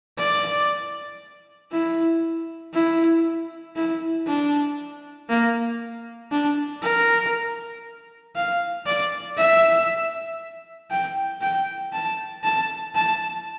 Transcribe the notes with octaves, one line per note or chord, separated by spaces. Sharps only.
D5
E4
E4
E4
D4
A#3
D4
A#4
F5
D5
E5
G5
G5
A5
A5
A5